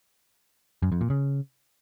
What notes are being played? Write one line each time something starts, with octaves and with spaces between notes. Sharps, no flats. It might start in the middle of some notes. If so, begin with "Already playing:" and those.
F#2
F2
A#2
C#3